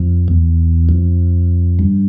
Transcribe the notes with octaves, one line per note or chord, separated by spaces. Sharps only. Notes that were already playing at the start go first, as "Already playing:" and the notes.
Already playing: F2
E2
F2
G2